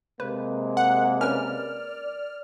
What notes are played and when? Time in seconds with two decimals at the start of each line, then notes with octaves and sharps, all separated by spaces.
0.20 C3 G#3 A#3 B4
0.77 F#5
1.21 C#4 A#4 B4 D5 F6